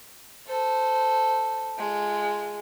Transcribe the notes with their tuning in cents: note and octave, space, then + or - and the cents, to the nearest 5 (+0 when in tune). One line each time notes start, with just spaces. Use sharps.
A4 +0 C5 -15
G#3 +0 F4 -25